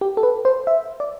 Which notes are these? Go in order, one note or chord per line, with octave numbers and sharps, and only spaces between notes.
G4
A4
B4
C5
E5
D5